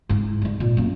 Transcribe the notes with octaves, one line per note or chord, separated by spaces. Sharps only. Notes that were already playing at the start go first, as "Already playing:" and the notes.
G#2 E4
G#2 G3
A#2
F#2 A#3